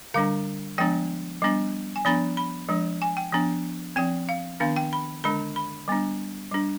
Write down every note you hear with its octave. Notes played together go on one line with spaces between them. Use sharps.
D3 G3 D4 F5
F3 G#3 B3 D4 G5
G3 B3 D4
G#5
F3 B3 D4 B5
B5
F3 G#3 D4
G#5
G5
F3 B3 D4
F3 C4 G5
F5
D#3 B3 D4 F5
G5
B5
D3 G#3 D4 B5
B5
G3 B3 D4
G3 D4